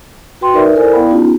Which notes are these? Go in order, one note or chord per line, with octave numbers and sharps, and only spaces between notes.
F#4 B4 G5 C6
D#4 A#4 B4 D5 E5
E4 A4 A#4 C5 D5 G#5
B3 E4 D5 F5 G5 B5
B3 C#4 D#4 F4 G4